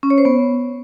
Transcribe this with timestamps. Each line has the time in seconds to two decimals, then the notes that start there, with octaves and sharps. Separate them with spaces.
0.03 C#4
0.10 C#5
0.18 C5
0.25 B3